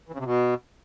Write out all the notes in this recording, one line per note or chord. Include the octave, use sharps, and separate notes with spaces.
E3
C#3
C3
B2